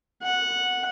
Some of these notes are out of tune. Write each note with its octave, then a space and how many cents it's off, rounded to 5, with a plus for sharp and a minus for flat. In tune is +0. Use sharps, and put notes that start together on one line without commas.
F#5 -10